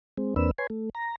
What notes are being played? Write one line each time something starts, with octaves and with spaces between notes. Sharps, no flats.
G#3 C4
E2 A#3 C4 D4 B4 E6
B4 C#5 G#5 C6
A3
A#5